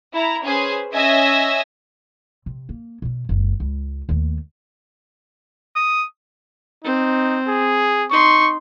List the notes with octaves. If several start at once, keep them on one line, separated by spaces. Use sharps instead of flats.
E4 A#5
C#4 G#4 B4 C5
C#4 D#5 E5 G#5 E6 A#6
C3
A#3
B2 C#4
F#1 C#2
C#2
D#2 A3
D#6
C4 D#4
G#4
D#4 C6 C#6